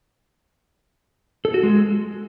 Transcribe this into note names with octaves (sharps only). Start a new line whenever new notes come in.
A4
F#4
G#3